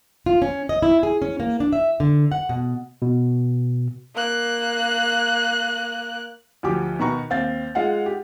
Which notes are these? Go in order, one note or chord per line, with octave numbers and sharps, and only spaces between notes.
F4
C#4
D#5
E4
G#4
C#4
A#3
D4
E5
D3
F#5
B2
B2
A#3 F#6
D2 F3 F#4 G4 D6
B2 D#3 F#4 B4 A#5 C#6
D#2 C4 F5 G6 A6
G#3 F4 F5 F#5
G4